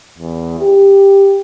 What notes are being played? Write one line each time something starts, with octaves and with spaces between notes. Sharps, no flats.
E2
G4